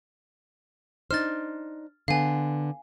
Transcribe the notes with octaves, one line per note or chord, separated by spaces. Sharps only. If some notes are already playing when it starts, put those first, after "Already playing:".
D4 D#4 C5 F6 A6
D3 B3 F5 G#5